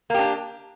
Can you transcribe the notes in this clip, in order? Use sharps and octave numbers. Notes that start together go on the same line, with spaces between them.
A#3 D4 G4